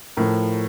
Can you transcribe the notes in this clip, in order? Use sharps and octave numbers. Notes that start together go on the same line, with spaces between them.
A2 F3 A#4